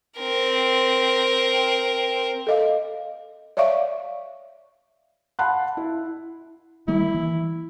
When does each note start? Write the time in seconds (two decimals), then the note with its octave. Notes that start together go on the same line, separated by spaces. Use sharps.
0.20 C4 A#4
2.47 A4 D#5 F5
3.57 C#5 D5 E5 F5 C#6
5.39 F5 F#5 A5 B5 C6 F#6
5.77 E4
6.88 D#3 G3 A#3 E4
7.14 E3